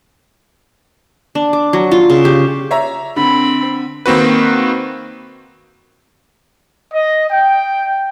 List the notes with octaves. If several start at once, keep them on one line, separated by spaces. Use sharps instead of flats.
D4
D6
F#3
F4
C#3
G4
C#5 E5 A#5
D3 C4 B5
D#3 A#3 C4 F#4 B4
D#5
G5